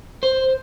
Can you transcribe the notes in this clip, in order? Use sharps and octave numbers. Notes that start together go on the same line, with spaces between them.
C5